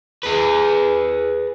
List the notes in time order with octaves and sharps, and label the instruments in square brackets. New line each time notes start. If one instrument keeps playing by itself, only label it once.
[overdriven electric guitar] G#4 B4